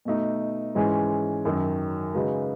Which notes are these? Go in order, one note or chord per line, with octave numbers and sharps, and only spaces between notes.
B2 A3 D#4
G#2 E3 G#3 C#4
F#2 D#3 F#3
C#3 G#3 D#4 F#4 B4